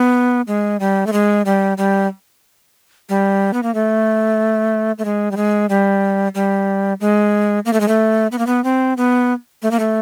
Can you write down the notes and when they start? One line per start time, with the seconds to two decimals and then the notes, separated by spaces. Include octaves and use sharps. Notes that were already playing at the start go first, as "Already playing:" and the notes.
Already playing: B3
0.47 G#3
0.80 G3
1.07 A3
1.13 G#3
1.45 G3
1.78 G3
3.09 G3
3.53 B3
3.63 A#3
3.74 A3
4.98 A3
5.05 G#3
5.31 G3
5.37 G#3
5.69 G3
6.35 G3
7.01 G#3
7.65 A#3
7.73 A3
7.80 G#3
7.88 A3
8.32 B3
8.38 A#3
8.47 B3
8.64 C4
8.97 B3
9.62 A3
9.71 A#3
9.79 A3